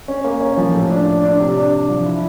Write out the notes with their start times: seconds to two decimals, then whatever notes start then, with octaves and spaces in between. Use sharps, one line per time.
0.08 C#4
0.24 A#3
0.40 C#4
0.57 F3
0.74 A2
0.91 D4
1.07 D4
1.23 D4
1.39 C3
1.57 D4
1.73 D4
1.89 F3
2.06 E4